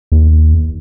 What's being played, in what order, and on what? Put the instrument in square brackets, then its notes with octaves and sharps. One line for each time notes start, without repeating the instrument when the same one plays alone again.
[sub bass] D#2